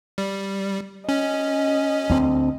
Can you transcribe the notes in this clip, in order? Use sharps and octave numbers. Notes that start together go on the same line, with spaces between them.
G3
C#4 D#5
D2 C4